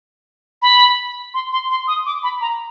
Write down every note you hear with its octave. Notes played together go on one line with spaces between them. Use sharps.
B5
C6
C6
C6
D#6
D6
B5
A#5